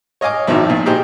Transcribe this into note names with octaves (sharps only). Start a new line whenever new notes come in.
C#5 D#5 F5 G#5 D6
G#1 D#3 F3 E4
A#2
D#4 G4 G#4 C5